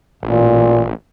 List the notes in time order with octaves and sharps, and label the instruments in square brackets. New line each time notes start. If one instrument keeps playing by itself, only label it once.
[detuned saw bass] A1 [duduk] A#2